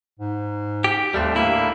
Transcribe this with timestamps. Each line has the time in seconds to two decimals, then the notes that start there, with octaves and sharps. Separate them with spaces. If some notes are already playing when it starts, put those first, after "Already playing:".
0.19 G#2
0.84 G4
1.14 D#2 G3 A3 C4
1.35 A2 D3 A#3 E4